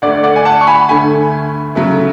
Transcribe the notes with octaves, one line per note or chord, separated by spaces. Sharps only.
D2 D3 A3 D5 F#5
D5 F#5
G#5
F#5 A5
C#6
G#5 B5
D2 D3 A3 G#5 B5
C#3 F#3 A3 E4 A4